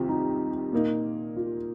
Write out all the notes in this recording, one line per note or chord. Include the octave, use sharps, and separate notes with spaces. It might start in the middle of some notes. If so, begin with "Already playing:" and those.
Already playing: C2 C3 D#3 C4 F4
D#4
A#2 A#3 D#4
F4